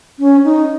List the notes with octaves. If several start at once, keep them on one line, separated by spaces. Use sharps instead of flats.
C#4
D#4